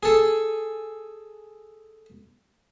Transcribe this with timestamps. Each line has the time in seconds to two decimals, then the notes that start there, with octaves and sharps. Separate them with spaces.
0.03 G#4 A4